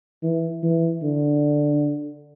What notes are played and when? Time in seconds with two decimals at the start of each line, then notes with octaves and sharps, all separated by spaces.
0.23 E3
0.63 E3
1.03 D3